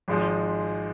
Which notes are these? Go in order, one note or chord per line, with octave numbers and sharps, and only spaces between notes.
G#1 G#2 F3 G#3